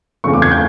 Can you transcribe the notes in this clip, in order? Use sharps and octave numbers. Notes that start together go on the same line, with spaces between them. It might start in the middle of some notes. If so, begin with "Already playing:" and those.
E2 C#3 F3 A3 C4 C#6
D6
G#6
G6